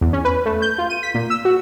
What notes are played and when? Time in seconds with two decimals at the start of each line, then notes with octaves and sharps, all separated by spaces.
0.01 E2
0.13 C#4
0.25 B4
0.46 A3
0.62 G6
0.78 F4
0.90 D#7
1.03 B6
1.14 A#2
1.30 E6
1.45 F#4